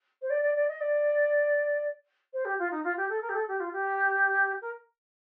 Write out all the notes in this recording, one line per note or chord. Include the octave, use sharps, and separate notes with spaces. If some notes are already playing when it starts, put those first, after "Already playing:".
C5
D5
D5
D5
D#5
D5
C5
G4
F4
D#4
F4
G4
A4
A#4
G4
A4
G4
F4
G4
A#4